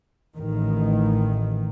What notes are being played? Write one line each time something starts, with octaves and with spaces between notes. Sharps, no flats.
A1 D#3